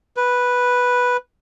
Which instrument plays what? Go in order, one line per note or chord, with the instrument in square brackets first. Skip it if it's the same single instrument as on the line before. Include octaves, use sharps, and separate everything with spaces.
[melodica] B4